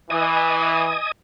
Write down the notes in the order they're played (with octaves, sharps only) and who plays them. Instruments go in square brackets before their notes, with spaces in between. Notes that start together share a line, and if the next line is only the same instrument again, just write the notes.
[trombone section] E3 [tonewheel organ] D#5 G#5 D#6